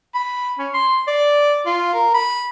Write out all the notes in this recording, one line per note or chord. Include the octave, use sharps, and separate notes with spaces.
B5
C#4
C6
D5
F4
A#4
B5